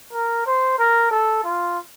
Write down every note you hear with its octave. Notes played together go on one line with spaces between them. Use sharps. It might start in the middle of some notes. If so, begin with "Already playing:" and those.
A#4
C5
A#4
A4
F4